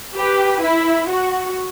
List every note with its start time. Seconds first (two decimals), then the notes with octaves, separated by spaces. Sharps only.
0.16 G4 B4
0.62 E4
1.09 F#4